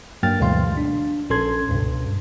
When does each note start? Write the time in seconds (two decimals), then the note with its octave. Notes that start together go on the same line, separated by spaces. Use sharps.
0.23 G2 F#3 A#3 G5 F6 A6
0.40 D2 B2 E3 G#3 F5 C6
0.77 D4
1.30 A#1 C#4 A4 C6 G#6
1.69 C#2 G2 B2